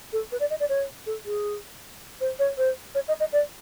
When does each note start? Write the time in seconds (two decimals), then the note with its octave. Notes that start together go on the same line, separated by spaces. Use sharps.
0.13 A4
0.32 B4
0.40 D5
0.50 D#5
0.60 D5
0.69 C#5
1.06 A4
1.26 G#4
2.21 C5
2.39 C#5
2.58 C5
2.95 C#5
3.08 D#5
3.20 D#5
3.33 D5